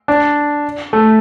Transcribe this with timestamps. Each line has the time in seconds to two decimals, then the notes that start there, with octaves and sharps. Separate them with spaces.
0.08 D4
0.93 A3